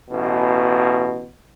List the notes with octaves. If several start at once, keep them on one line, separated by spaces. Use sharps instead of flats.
A1 B2